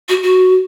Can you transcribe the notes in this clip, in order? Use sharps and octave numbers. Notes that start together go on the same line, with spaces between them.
F#4
F#4